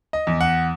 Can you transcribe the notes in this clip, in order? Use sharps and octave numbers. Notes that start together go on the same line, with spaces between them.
D#5
E2
F#5